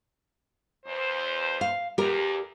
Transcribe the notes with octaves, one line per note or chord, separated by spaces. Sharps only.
E2 C5
F5
E2 G4 A#4